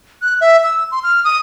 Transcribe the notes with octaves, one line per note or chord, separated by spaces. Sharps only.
F#6
E5
E6
C6
F6
D#6